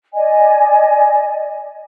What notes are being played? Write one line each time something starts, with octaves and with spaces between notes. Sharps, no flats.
D5 D#5 G#5